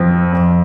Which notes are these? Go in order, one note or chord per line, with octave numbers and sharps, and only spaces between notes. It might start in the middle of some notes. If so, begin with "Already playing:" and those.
Already playing: F2 F3 C4
F2